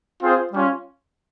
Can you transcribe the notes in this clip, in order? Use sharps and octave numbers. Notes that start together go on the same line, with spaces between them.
C4 F4 G#4 C5
G3 C#4 F4